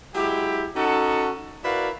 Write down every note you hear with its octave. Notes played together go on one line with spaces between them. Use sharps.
F#3 G#3 E4 G4
C#4 D#4 F#4 A4
E4 F#4 A#4 B4 D5 F5